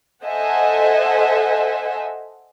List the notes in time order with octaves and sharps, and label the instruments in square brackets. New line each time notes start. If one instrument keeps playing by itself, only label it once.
[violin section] A4 C5 D#5 E5 F#5 G#5